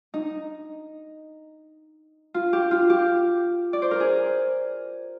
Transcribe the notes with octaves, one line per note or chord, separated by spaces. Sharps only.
D#4
F4
G4
F4
G4
D5
C5
A#4
G#4